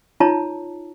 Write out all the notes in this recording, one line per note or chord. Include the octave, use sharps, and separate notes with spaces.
D#4 F4 C#5 A5 A#5